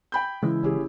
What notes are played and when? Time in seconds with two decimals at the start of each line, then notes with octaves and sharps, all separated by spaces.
0.12 G5 B5 G6
0.42 C#3 E3 G#3 E4
0.63 F#1 C#4 G4 G#4